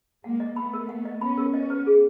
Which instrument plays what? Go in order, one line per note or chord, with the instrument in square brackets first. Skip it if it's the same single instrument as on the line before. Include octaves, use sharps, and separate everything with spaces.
[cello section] G#3 A#3 [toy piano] F#5
[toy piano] D#5
[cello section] A3 B3 [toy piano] B5
[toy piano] A#4
F#5
D#5
[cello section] B3 C#4 [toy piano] B5
[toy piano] A#4
[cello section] B3 C#4 [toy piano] D#5
[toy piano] B4
G#4